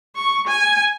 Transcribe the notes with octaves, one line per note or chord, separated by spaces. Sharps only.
C#6
G#5